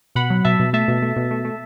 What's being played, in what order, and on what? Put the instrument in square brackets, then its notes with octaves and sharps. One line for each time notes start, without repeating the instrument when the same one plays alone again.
[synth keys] B2 F#5 B5
F#3
B2 E5 A5
B2
A3 E5 A5
B2
A3
B2
A3
A3